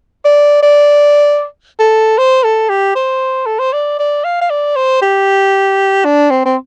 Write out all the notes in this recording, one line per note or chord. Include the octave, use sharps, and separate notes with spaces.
D5
D5
A4
C5
A4
G4
C5
A4
C5
D5
D5
F5
F5
D5
C5
G4
D4
C4
C4